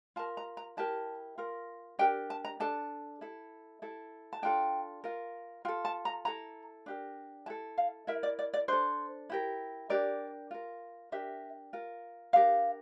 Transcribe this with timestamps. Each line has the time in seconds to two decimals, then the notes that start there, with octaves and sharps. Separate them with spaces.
0.16 F4 A#4 A5
0.37 A#5
0.57 A#5
0.77 E4 G4 A#4 A5
1.38 F4 A#4
1.99 D4 G4 A#4 G5
2.30 A5
2.45 A#5
2.60 D4 A4 A5
3.21 E4 A4
3.82 E4 A4
4.33 A5
4.42 D4 F4 A4 G5
5.04 F4 A#4
5.65 F4 G5
5.68 A4
5.85 A5
6.05 A#5
6.25 E4 A4 A#5
6.86 D4 G4 A#4
7.46 E4 A4 A5
7.78 F5
8.07 E4 A#4 E5
8.23 D5
8.39 D5
8.54 D5
8.68 D4 A4 C5
9.30 E4 G4 A#4
9.90 D4 G4 A#4 D5
10.51 F4 A#4
11.12 D4 G4 A#4 E5
11.73 F4 A#4
12.33 D4 G4 A#4 F5